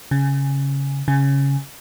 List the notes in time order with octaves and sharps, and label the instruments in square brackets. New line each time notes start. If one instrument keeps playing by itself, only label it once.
[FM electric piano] C#3
C#3